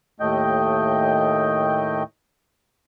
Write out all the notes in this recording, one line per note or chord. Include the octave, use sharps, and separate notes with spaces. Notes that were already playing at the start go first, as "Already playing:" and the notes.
D#2 A2 A3 D#5 G5